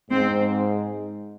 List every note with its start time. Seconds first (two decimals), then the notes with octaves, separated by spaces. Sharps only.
0.11 G#2 C4